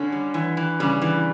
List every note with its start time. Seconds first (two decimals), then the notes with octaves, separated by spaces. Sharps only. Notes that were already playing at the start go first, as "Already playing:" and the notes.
Already playing: D3 C#4
0.12 G3
0.34 E3
0.57 E3
0.80 C#3 G3
1.02 E3